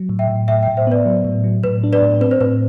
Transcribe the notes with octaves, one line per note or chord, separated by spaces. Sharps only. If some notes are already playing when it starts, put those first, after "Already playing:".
Already playing: F#3
A2
E5 G5
A2
A2 E5 G5
E5 G5
A2
C5 E5
B3 B4 D5
F#3
A2
F#3
A2 B4
D4
B4 D5
A2
C4 B4
C5
A2 B4